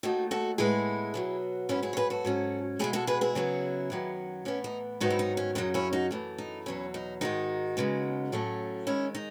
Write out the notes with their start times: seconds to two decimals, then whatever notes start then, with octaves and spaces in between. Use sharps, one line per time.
0.03 D#2 D#3 A3 D#4 F#4
0.31 F#4 A4
0.58 A2 G#3 B3 E4 G#4
1.14 B2 F#3 B3
1.69 G#2 F#3 B3 C#4 E4
1.83 E4 G#4
1.93 C#5
1.97 G#4 B4
2.10 F#4 A4
2.25 G#2 F#3 C#4
2.79 E2 B2 G#3 E4 G#4
2.93 F#4 A4
3.07 G#4 B4
3.21 E4 G#4
3.35 C#3 F#3 B3
3.90 F#2 D#3 F#3 B3
4.45 A2 E3 B3 C#4
4.64 D#4
5.00 G#2 D#3 F#3 B3 D#4 F#4
5.10 E4
5.19 D#4
5.37 C#4
5.55 F#2 C#3 F#3 D#4
5.74 C#4 E4
5.93 D#4 F#4
6.11 F#2 E3 A3
6.38 D#4
6.66 E2 B2 F#3 C#4
6.94 D#4
7.21 G#2 D#3 G#3 D#4 F#4
7.77 D#2 C#3 G#3 B3
8.32 A2 F#3 A3 C#4
8.87 G#2 D#3 G#3 C#4 E4
9.15 D#4